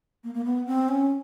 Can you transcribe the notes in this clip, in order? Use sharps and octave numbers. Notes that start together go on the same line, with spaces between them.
A#3
A#3
B3
C4
C#4